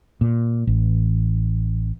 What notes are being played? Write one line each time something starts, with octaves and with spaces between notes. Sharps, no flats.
A#2
A1